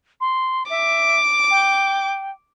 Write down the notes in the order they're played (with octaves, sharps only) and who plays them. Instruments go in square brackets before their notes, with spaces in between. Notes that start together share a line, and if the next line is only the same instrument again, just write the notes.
[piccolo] C6
[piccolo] E5 [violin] D6
[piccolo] G5